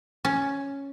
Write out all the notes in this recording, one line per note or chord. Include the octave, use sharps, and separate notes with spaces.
C#4